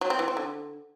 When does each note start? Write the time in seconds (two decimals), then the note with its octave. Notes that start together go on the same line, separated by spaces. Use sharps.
0.01 F#3
0.10 C4
0.19 E3
0.28 C4
0.37 D3